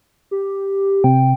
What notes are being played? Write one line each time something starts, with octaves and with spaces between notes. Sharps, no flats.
G4
C3 G5